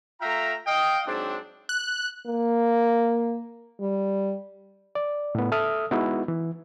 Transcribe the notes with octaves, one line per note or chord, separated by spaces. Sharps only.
A3 F4 E5 G5 A#5
D#5 F5 G5
G#2 F#3 C4 D4
F#6
A#3
G3
D5
A2 B3
A4 E5 D#6 F6
G#3 B3 D#4 E4 F#4
E3